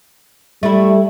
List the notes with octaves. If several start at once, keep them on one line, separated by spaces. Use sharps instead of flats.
G3 A3 E4